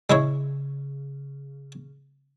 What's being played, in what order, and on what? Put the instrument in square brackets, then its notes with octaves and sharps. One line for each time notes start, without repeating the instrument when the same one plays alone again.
[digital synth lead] C#3 [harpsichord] G#3 E4 C#5